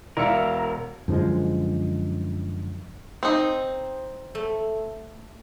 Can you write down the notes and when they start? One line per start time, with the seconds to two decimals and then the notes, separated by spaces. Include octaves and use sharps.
0.17 E1 A#4 D5 E5 F5 E6 C#7
1.08 F#2 D3 F3 G#3
3.23 C4 D#4
4.35 A3